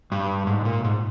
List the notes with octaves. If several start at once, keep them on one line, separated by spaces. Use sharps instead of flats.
G2
G#2
A#2
G#2